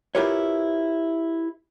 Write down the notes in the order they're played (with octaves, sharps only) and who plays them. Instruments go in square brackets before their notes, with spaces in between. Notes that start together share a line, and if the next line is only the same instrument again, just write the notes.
[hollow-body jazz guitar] E4 F4 G4 A#4 B4 C#5